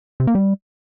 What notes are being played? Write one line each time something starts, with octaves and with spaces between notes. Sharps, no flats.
C3
A#3
G3